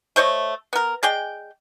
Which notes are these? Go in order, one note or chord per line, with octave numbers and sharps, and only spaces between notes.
A3 C5 C#5 D#5
B3 A#4
G#3 G#4 D5 G5